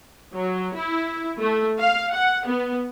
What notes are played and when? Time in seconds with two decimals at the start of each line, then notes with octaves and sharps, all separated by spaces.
0.34 F#3
0.75 E4
1.41 A3
1.79 F5
2.14 F#5
2.46 B3